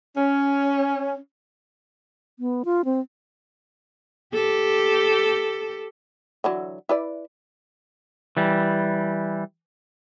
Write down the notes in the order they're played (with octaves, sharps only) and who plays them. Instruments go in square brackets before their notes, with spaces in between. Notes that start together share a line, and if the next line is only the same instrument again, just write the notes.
[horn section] C#4
[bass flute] B3
F4
C4
[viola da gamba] G4 A4
[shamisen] D3 E3 F#3
E4 B4 D5
[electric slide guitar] E3 G3